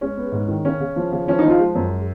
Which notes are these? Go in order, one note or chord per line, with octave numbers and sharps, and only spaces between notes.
G#3 C#4
B3
G#2
D#3
C#3 C#4
C#3
F3
C#3
F3 C#4
D#4
F3
F4
G#3
F#2